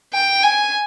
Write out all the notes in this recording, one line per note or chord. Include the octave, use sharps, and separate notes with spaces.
G5
G#5